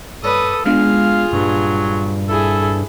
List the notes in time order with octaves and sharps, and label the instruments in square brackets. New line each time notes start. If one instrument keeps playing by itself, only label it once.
[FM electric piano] G2 C#5 D5 [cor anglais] A4 [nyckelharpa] B4 D#6
[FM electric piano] G#3 B3 D4 [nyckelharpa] F4 G#4 [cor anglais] F5
[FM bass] G2 [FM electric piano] A#2 [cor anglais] F#3
[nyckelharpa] E4 G#4 [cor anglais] A4